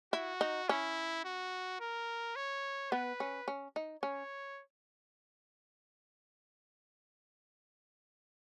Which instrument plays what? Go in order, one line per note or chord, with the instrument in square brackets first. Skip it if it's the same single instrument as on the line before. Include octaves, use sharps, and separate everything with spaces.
[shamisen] E4 [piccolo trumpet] F#4
[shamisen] D#4
[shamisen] C#4 [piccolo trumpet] E4
[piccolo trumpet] F#4
A#4
C#5
[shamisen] B3 [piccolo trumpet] B4
[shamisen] C#4
C#4
D#4
[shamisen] C#4 [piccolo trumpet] C#5